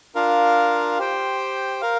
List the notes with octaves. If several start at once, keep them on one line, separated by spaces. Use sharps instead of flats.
D4 F4 A#4 F5
G4 C5 G5
A#4 F5